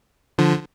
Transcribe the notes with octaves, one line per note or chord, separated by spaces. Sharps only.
D3 F3